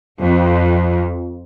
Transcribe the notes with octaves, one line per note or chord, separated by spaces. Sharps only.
F2